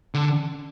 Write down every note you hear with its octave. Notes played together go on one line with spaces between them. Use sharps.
D3